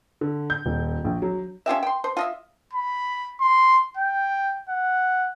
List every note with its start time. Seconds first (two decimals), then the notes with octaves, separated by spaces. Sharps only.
0.21 D3
0.50 G6
0.66 D#1
1.04 A#1
1.22 F#3
1.66 C#4 F4 G4 E5
1.83 G5 C6
2.04 C5
2.17 F4 D#5 E5
2.73 B5
3.41 C6
3.97 G5
4.69 F#5